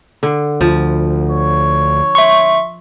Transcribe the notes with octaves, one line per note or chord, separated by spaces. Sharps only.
D3
D2 F3
C#5
E5 C6 C#6